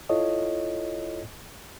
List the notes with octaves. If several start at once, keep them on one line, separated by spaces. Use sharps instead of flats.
E4 F4 A4 C#5 D#5